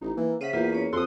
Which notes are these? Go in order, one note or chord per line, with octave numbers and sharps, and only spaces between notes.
A1 D#4
E3 A#3
C#3 C5 E5 F#5 B6 D#7
E2 A#3 F4 G4
C#4 C#5
F2 C4 F#4 A4 C6 D#6